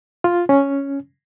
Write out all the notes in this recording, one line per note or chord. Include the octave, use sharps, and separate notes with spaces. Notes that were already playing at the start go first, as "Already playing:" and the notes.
F4
C#4